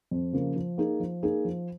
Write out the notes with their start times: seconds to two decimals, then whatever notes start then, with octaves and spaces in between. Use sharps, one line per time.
0.11 F2
0.33 C#3 F3 A#3
0.56 F3
0.78 A#3 D#4 G#4
1.00 F3
1.23 A#3 D#4 G#4
1.45 F3